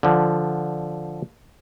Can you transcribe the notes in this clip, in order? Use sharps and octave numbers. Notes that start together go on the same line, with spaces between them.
D3 F3